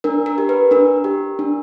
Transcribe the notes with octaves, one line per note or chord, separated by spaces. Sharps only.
D4 A#4
A#4
G4
B4
D4 A#4
G4
D4